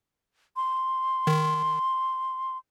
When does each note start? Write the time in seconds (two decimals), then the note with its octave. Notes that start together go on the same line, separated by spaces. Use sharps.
0.56 C6
1.27 D#3